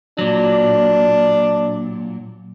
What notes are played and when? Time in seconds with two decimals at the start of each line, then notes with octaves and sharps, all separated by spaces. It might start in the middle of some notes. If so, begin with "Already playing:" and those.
0.18 A#2 F#3 D4